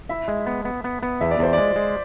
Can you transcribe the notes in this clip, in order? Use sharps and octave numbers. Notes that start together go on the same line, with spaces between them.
E4 E5
G#3
B3
B3
B3
B3
E2 E5
D5
E2 C5
G#3 D5
G#3